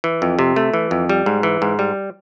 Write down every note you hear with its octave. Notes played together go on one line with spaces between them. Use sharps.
E3
F2
C3
A3
E3
F2
G3
G#2
E3
G#2
G3